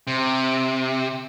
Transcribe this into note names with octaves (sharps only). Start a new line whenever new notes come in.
C3